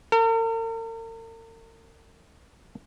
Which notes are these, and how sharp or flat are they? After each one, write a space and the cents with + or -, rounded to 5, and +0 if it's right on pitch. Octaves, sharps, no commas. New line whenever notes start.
A#4 -45